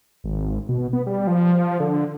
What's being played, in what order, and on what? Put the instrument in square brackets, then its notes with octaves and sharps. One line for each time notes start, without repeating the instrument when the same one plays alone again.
[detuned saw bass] G#1
B2
B3
G3
F3
D3